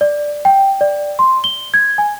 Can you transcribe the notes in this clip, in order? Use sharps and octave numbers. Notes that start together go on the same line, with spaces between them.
D5
G5
D5
C6
G7
G#6
G#5